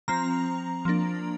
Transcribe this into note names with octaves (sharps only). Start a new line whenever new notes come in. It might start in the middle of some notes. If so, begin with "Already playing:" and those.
F3 C4 A#5
F3 A#3 D4